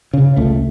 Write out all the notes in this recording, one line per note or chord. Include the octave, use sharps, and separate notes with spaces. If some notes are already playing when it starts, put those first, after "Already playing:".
C#3
C#2 A3